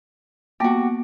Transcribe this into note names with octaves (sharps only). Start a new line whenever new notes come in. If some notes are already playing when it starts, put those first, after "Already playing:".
A#3 B3 F#4 G4